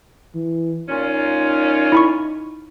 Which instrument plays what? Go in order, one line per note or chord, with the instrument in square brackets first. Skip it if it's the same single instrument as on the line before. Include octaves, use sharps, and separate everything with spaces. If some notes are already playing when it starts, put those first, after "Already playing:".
[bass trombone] E3
[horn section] A#2 C#4 F4 [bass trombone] D#4
[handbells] E4 B5 C#6